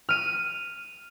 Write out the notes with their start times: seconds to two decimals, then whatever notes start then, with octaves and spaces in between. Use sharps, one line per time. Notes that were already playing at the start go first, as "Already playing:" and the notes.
0.09 F6 D#7